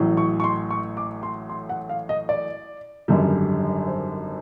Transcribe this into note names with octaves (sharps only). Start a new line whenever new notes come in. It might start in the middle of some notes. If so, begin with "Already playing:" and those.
Already playing: A1 A2 F#3
C#6
C#6
C6
C#6
D6
C6
C6
F#5
F5
D#5
D5
G#1 F#2 D3 G3
C5